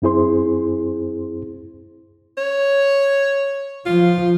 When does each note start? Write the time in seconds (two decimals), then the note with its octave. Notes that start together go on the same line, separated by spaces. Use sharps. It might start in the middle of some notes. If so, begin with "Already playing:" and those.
0.02 F#2 C4 E4 G#4 C5 C6
2.37 C#5
3.86 F3 F4